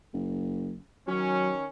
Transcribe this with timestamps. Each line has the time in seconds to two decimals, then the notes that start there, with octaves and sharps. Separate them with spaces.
0.13 F#1
1.08 D#3 F#3 C#4